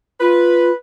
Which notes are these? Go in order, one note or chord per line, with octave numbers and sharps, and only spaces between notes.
F4 B4